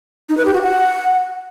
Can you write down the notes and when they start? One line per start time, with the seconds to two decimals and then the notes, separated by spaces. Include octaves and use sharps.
0.29 D#4
0.37 B4
0.45 G4
0.54 F#4
0.62 F#5